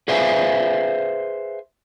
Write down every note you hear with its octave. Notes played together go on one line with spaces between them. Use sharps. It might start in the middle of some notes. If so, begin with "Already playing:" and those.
G#4 B4 C5 E5 F5 G#5